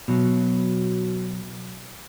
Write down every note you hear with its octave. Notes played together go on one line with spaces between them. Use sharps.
B2 F#3